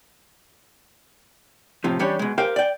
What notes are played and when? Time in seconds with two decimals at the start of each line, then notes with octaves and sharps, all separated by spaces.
1.84 A2 C3 F3
1.99 E3 G3 C#4 D4 G4 C#5
2.19 B2 G#3
2.38 G4 A#4 C5 F5 G5
2.56 D5 G5